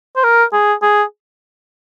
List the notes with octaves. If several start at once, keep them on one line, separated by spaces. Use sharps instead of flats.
C5
A#4
G#4
G#4